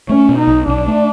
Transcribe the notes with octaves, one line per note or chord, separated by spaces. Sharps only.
A3 C#4
B2
D#4
B1
B1 D4
A3